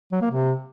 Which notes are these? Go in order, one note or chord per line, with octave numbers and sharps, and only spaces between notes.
F#3
A#3
C3